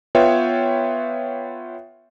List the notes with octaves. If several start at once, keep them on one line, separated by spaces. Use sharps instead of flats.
B3 F4 B4 C#5 E5 G5